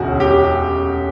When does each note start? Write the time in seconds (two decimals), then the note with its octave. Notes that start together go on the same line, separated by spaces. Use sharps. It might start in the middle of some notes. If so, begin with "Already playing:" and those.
Already playing: E1 D2 C#4 F#4
0.20 G4